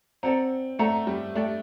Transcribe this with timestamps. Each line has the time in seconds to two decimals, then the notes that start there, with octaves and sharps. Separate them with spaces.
0.23 C4 A4 D5 F#5 A#5
0.79 A3 A4 D5 F#5 A#5
1.07 G3
1.35 A3 D4 A4 D5 G5